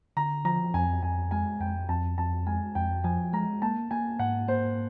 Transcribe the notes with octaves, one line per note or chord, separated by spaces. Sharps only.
D3 A#5
F3 A#5
F2 G#5
F2 G#5
G#3 G#5
F2 G5
F2 A5
F2 A5
G#3 G#5
F2 G5
F3 G#5
G#3 A#5
A#3 A5
A#3 G#5
G#2 F#5
A#3 C5